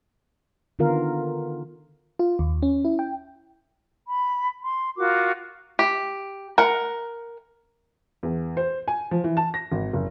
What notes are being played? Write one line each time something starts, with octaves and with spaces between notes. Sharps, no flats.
D3 D#3 B3 F4 A#4 F5
F4
D#2
C#4
E4
G5
B5
C6
F4 F#4 A#4 D6
G4
A#4 F#5
E2
C5
G#5
F3
E3
A5
A#6
G#1
F#1